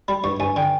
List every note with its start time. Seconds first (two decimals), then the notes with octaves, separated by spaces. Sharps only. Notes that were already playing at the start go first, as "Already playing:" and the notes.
0.08 G3 B5
0.24 G2 C#6
0.40 G2 G#5
0.56 D3 G5